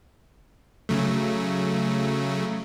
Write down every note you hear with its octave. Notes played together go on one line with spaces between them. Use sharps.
C#3 F#3 A3